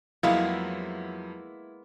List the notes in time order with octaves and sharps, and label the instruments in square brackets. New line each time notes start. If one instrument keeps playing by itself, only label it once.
[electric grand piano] F2 F3 F#3 [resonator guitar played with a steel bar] G#3 A#3 B3 [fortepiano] E4 [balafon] F5